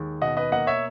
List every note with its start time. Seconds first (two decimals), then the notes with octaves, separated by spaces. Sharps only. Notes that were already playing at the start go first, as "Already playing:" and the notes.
Already playing: D#2 G#3
0.21 B2 D#5 F#5
0.37 B4 D#5
0.52 A#3 D#5 F#5
0.67 C#5 E5